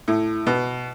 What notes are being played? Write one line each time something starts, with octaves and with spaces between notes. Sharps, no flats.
A2
B2